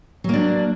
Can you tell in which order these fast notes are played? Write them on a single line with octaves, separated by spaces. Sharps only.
F#3 A#3 D4